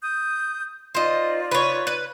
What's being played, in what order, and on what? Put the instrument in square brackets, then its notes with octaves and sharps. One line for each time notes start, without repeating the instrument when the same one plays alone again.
[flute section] D#6 G6
[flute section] D#4 F4 D5 [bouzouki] C5 D#5
[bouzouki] B4 C#5
B4